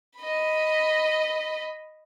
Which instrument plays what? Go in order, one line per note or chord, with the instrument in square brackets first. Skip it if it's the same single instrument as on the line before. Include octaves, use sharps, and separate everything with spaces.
[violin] D#5 B5